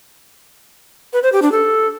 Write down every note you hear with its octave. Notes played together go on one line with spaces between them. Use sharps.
B4
C5
G4
D4
A4